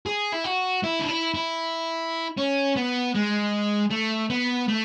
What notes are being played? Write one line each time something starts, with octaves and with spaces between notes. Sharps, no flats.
G#4
E4
F#4
E4
D4
E4
E4
C#4
B3
G#3
A3
B3
A3